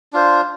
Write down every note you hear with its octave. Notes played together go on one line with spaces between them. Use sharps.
D4 F4 C5